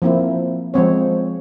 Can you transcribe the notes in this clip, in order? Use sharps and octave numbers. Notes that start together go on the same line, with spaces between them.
F3 A#3 C4 E4
F3 G#3 C4 C#5